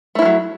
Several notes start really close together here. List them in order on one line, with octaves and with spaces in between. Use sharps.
A3 E4 F3 F#3